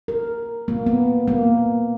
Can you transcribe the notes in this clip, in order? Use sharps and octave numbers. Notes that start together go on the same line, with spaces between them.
A#4
A#3
B3
A#3